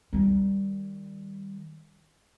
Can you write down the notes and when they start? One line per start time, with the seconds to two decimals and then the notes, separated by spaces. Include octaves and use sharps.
0.13 D#3 G3